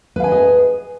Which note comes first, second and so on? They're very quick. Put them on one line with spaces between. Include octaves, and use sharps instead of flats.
B4 F5 G#5 D#5 G#4